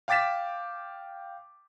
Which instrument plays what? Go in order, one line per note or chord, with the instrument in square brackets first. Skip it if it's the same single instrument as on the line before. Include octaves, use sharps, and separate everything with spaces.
[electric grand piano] F5 G5 D6 A6 B6 E7